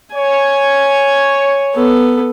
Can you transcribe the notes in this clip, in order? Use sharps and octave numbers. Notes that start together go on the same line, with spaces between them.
C#5 G#5
B3 A4